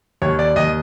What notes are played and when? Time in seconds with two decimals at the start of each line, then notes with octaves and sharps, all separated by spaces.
0.22 D#2 C#5
0.39 D5
0.56 D#2 D#5